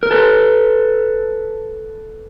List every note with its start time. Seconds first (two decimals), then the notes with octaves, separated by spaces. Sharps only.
0.03 A#4
0.11 A4 B4